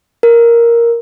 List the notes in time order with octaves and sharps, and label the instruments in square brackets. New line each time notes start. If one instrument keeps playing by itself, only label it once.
[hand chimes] A#4